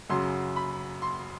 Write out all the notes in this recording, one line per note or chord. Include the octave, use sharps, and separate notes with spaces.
F#2 C#3 F#3 C6
B5
C6